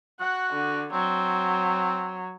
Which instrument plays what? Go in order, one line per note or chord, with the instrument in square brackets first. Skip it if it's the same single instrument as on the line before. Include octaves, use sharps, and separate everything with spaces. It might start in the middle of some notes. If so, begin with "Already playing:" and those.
[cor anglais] F#4 [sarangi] F#5
[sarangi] D3
[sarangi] F#3 [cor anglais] C4